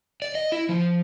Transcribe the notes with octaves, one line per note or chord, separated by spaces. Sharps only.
D5
D#5
E4
F3